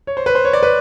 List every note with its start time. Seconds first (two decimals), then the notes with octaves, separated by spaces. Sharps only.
0.07 C#5
0.17 C5
0.26 B4
0.35 C5
0.45 C#5
0.53 D5
0.63 B4